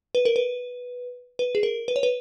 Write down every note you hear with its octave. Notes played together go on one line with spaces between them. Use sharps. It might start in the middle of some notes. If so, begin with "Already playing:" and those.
B4
A#4
B4
B4
G#4
A#4
B4
C#5
B4